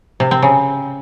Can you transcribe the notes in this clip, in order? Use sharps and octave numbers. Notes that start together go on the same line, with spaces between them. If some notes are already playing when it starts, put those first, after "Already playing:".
C3
C4
C#3